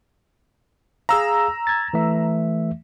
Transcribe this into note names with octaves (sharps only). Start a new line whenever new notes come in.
G#4 F5 A#5 E6
G#6 A6
E3 A3 E5